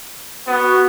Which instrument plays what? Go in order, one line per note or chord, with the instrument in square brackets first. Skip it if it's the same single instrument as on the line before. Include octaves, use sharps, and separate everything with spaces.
[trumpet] B3 [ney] F#4